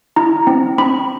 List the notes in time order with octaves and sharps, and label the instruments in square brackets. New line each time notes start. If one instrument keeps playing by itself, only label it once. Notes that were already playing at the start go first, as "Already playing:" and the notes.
[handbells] E4 A#5
C4
C4 B5